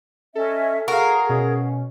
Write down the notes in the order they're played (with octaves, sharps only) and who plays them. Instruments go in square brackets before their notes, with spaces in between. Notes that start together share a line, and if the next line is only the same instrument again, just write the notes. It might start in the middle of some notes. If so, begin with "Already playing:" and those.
[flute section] C#4 D#5 E5 [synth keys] A4
[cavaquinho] F#4 F5 [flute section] G#4 [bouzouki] A#4
[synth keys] B2 C#4